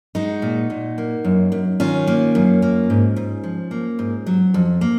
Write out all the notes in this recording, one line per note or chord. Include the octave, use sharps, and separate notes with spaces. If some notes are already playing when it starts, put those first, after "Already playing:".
G#3 D#4 F#4
A#2
A#2
A#3
F#2
F#2
D#3 C#4 F4
A#3
F#2
A#3
G#2
G#2
F3
A#3
G#2
F#3
F2
A#3